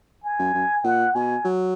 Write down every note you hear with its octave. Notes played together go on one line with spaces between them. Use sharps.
G#5
F#2
F#2
A#2 F#5
B2 G#5
F#3